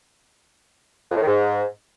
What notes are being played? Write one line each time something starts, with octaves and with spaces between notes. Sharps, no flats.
F2
A2
D#3
G#2